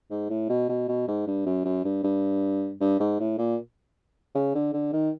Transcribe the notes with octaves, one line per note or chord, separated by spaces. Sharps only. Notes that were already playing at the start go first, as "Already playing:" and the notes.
G#2
A2
B2
B2
B2
G#2
G2
F#2
F#2
G2
G2
G2
G#2
A2
A#2
C#3
D3
D3
D#3